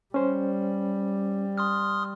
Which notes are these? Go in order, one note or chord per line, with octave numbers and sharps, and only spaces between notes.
G3 C#4 C5
C6 D#6 F6